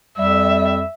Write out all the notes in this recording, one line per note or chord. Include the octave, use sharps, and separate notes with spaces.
F2 G3 E5